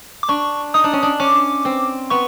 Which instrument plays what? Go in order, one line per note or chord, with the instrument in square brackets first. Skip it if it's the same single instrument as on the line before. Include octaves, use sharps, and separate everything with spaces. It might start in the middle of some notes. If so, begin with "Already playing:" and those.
[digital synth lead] D6
[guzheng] D4 [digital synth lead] C#6
[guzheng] D#4 [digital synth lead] D#6
[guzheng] D4
C#4
D4
[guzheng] C#4 [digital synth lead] D6
[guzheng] C4
[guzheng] B3 [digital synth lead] C#6